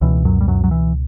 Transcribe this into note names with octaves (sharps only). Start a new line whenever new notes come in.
C#2 B2 E3
F#2 F#3
G3
F#2 F#3
F#3
E3